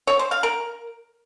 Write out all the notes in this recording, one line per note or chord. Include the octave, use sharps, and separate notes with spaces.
C#5
C5
F5
A#4